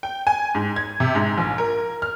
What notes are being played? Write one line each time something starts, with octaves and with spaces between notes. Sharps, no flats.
G5
G#5
G#2
G#6
C3
G#2
A#1
A#4
F6